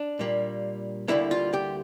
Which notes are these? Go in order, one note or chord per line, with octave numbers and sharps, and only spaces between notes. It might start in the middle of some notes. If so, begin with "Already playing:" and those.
Already playing: D4
A#2 G3 A#3
D2 D3 G3 A#3 E4
F4
G4